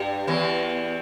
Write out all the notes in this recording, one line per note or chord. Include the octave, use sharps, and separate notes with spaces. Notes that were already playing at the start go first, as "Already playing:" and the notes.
Already playing: G2 G3
E2 E3